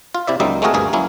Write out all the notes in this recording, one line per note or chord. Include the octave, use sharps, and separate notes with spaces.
F4
C3 E4 D5 E5
C#2 F#3 G3 A#3 D#4 E5
G#3 A3 C4 F#4 G#4 A#4
D2 G2 A#3 G#4
F#3 A#3 C#4 E4